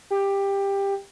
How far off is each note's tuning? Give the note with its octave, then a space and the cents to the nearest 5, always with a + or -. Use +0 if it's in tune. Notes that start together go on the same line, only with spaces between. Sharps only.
G4 +15